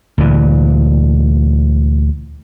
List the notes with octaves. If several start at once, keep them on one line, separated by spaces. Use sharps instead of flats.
D2 A#2 E3